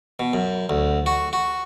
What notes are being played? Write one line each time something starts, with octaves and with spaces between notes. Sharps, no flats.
B2
F#2
D2
F#4
F#4